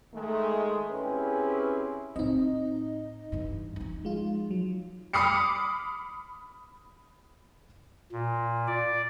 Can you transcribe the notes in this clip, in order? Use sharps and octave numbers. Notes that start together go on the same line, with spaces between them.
D#3 G#3 A3
C4 C#4 E4 G4 G#4 B4
A2 C4 D#4 D#5
G2 E3
F3 D#4
G#3 F4
F#3
B5 D6 D#6 F6 C7 C#7
A#2
D5